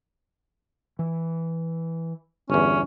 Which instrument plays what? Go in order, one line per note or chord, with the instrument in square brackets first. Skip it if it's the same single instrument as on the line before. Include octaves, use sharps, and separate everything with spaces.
[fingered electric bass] E3
[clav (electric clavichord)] G1 E2 [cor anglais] C#4